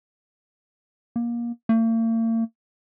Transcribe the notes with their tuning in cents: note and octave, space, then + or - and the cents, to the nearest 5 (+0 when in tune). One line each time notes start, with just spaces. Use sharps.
A#3 +25
A#3 -45